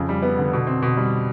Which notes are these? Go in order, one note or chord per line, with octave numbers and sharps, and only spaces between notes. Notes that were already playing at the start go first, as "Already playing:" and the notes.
Already playing: F2 C#3
G3
B3
D3
B2
C4
B2
G3